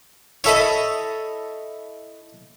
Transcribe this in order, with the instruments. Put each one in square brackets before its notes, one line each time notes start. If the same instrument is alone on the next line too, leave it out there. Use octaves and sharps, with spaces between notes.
[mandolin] E4 A4 D#5 [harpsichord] C#5 E5 B5